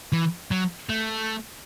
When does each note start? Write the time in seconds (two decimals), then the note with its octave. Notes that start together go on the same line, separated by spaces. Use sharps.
0.12 E3
0.51 F#3
0.89 A3